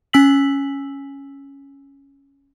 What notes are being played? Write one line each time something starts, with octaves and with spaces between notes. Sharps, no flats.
C#4 G#5 E6 B6 F#7